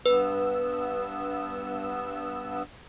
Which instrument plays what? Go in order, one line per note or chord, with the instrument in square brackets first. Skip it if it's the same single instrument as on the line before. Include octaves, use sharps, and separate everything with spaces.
[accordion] G2 B3 E6 [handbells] B4